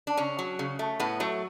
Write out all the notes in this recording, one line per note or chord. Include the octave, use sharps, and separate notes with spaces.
D4
C#3 C#4
F#3
C#3
A3
A2 B3
F#3 A3